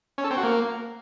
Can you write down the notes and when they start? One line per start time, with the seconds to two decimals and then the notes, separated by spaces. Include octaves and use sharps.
0.18 C#4
0.24 A4
0.31 C4
0.37 F#4
0.43 A#3